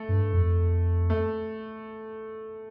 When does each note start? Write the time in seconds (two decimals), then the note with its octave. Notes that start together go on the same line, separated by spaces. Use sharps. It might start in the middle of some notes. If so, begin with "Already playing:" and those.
Already playing: A3
0.09 G2
0.33 F2
1.10 A3